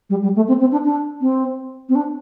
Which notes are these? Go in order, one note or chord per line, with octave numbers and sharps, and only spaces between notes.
G3
G3
A3
C4
C4
D4
D4
C4
C4
D4